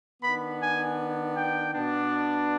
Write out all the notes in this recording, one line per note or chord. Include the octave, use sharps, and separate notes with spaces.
D#3 B3 D4 B5
G#5
G5
B2 B3 D4